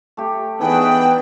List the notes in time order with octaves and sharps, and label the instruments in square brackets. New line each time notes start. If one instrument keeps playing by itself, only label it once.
[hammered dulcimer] A3 G4
[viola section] E3 D4 B4 [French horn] B3 [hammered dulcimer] D#4 G#4 [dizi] G5